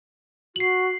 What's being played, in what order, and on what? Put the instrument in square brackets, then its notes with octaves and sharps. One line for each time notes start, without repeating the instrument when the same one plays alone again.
[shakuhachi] F#4 [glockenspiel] C7 F#7